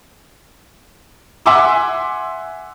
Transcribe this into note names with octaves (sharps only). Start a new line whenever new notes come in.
E5 F#5 G#5 C6 D6 E6